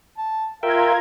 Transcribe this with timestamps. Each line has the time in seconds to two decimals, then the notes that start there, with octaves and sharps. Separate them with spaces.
0.17 A5
0.63 F4 A#4 E5 F5 G5 A#5 G#6